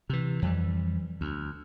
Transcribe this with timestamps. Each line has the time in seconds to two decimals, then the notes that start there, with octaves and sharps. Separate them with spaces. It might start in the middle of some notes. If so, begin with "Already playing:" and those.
0.10 C3 E3
0.42 F2 E3 G3
1.21 D2